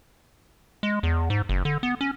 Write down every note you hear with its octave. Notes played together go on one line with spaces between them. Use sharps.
G#3
E2
G#2
F#1
D3
B3
C#4